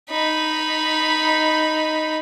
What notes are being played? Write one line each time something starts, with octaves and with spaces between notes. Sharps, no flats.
D#4 B5